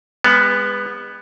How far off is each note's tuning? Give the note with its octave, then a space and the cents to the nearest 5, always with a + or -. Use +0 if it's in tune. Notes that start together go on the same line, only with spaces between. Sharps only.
G#3 -40 B3 +0